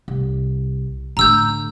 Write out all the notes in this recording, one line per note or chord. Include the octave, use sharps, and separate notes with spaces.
C2
A2 D3 A#5 E6 G6